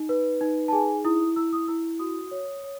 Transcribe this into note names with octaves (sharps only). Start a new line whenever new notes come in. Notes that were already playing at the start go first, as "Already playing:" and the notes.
Already playing: D#4
B4
D#4
A5
G#4 G#5
E4 D#6
E4 E6
D#6
E4 E6
F#4 D#6
C#5
C#5